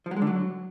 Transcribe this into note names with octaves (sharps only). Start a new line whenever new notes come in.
F3
F#3
G#3
D3
F#3